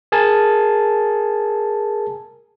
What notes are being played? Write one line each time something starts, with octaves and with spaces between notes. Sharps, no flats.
G#4 A#4 G#5 A5